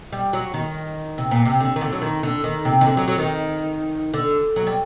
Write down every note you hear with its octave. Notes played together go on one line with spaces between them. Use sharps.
G3
F#3
D#3
C3
A#2
C3
D3
D#3
D3
F#3
D#3
D3
D#3
C3
D#3
D3
F#3
F#3
D#3
D3
F#3
G3